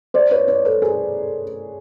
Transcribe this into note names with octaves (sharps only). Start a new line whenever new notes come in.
C5 D5
B4 C#5
B4 C#5
A4 B4
G#4 A#4